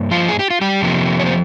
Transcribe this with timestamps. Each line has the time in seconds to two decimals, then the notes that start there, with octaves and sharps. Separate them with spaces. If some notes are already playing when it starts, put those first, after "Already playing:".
Already playing: G2 G3 A#3
0.11 F3 F4
0.28 G#4
0.39 G4
0.50 F4
0.61 G3 G4
0.81 F2 C3 F3 A#3
1.19 C#5
1.26 C5